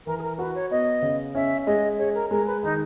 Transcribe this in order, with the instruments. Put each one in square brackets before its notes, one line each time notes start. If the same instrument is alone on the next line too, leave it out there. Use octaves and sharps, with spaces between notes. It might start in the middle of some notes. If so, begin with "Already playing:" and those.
[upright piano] E3 [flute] A#4
[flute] G#4
A#4
[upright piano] F#4 [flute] B4
[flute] C#5
[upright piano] B3 [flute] D#5
[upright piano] C#3
[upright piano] C#4 [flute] E5
[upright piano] G#3 [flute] D#5
[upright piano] G#4 [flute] C#5
[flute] A#4
[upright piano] G#3 [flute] A#4
[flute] B4
[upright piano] D#3 [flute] D#4